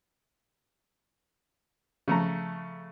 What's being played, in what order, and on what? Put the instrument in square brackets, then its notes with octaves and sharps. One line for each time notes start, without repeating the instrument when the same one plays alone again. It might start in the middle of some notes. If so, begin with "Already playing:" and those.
[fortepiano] C#3 A3 A#5 [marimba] F3